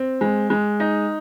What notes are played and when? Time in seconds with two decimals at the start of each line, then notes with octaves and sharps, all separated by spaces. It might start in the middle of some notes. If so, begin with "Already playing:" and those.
Already playing: C4
0.21 G#3
0.50 G#3
0.80 D#4